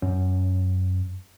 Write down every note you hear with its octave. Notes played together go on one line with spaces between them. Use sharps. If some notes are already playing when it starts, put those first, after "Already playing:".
F#2 C#4